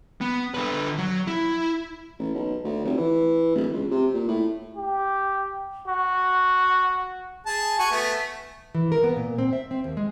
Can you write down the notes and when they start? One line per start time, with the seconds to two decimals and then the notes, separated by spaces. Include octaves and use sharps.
0.21 B3
0.54 D3 B4
0.98 F#3
1.27 E4
2.19 A1
2.34 B1
2.64 D2
2.85 F1
2.97 E3
3.55 D1
3.73 C#2
3.90 C3
4.14 A#2
4.28 A2
4.77 G4
5.87 F#4
7.46 G#4 A5
7.79 F#4 G#5 C#6
7.92 A3 B3
8.75 E3
8.92 A#4
9.04 B3
9.16 A#2
9.38 C4
9.53 E5
9.71 C4
9.84 D#2
9.97 G#3